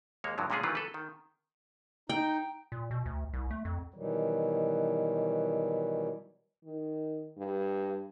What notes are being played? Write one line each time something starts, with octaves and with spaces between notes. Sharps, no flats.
D#2 G#3 A#3 C#5
G2 D3 F3 F#3
A#2 D3 G#3 C#4 F4 G#4
D#3 E3 F#3 G3 F4 B4
A4 B4
D#3
D#4 G5
A#2
B2
D2
C2
A3
F2
B2 D#3 E3 F#3 G3
D#3
G2